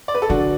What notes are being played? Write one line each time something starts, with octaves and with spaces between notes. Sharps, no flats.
D5
B4
A4
D3 D4 F#4